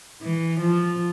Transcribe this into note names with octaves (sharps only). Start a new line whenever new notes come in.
E3
F3